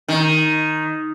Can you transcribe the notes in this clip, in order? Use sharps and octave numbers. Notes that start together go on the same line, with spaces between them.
D#3